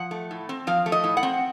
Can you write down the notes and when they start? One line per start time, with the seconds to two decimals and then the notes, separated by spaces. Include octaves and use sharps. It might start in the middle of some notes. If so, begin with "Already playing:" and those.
Already playing: F3 F#5
0.11 A3
0.31 A2
0.49 C4
0.67 F3 F5
0.86 A3
0.92 D#5
1.04 A2
1.17 F#5
1.23 C4